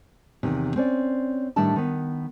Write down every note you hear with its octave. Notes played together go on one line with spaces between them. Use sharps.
E2 C3 D#3
C4 C#4 D5
A2 D#3 G3 D4 E5 A5
D#3 B3